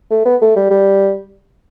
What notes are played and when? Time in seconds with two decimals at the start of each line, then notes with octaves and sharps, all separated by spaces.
0.11 A3
0.25 B3
0.41 A3
0.56 G3
0.70 G3